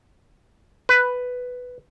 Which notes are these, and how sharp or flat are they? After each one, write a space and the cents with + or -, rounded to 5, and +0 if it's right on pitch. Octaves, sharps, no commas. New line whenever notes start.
B4 +5